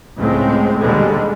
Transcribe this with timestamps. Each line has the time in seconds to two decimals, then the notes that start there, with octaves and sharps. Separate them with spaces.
0.17 C#2 A2 G#3 C4
0.80 D#2 B2 D3 G3 G#3